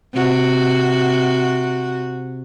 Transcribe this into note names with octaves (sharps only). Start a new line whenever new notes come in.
C3 F#4